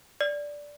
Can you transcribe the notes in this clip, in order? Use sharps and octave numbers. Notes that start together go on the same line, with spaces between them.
D5